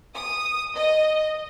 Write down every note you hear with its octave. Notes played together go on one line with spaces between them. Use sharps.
D#6
D#5